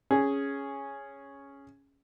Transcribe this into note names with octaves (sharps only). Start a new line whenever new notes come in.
C#4 G#4